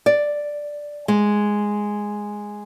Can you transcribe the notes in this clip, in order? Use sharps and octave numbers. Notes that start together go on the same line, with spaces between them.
D5
G#3